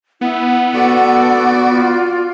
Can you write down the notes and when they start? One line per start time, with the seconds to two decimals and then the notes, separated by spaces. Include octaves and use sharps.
0.21 B3 E4 F#5
0.73 F#4 A4 D5
1.70 F4